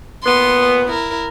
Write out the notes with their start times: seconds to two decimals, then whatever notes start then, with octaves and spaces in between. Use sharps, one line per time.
0.24 A#2 B3 C6
0.87 E4 A#4